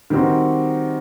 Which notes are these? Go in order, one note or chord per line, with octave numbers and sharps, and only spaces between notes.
D#3 G3 C4 F#4